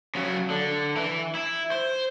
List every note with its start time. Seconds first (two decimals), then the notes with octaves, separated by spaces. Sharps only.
0.15 C#3 F#3
0.50 D3
0.96 E3
1.35 E4
1.72 C5